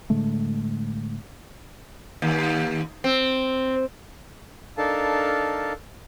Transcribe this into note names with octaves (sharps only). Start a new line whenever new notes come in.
A2 D3 G#3 A3
D#2
C4
D4 D#4 A4 A#4 F5 A5